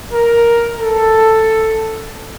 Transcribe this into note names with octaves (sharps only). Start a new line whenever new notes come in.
A#4
A4